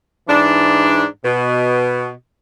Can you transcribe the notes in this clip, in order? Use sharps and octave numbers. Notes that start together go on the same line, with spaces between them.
G#2 E3 D4
B2